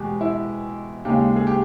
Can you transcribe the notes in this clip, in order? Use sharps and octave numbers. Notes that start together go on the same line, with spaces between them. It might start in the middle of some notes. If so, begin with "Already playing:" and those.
Already playing: E2 B2 G#3 G4
E4
D#2 C#3 G#3 G4
G#4
G4